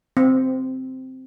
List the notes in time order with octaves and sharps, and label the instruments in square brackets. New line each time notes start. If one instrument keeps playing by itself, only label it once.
[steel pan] C4